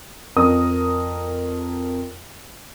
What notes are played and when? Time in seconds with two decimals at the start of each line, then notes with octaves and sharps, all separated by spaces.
0.36 F2 A#4 D#6